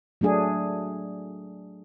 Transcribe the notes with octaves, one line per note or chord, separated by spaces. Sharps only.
F#3 A3 D4 G#4